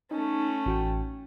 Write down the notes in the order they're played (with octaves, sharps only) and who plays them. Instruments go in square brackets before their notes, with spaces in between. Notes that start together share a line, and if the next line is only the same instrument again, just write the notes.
[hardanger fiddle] A3 C#4 [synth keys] D#4
[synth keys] A1 F#4 G5